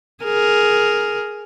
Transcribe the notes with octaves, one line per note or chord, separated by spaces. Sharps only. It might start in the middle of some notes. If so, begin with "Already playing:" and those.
G#4 A#4